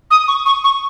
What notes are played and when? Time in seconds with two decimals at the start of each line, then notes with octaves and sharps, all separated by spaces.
0.11 D#6
0.28 C#6
0.46 C#6
0.64 C#6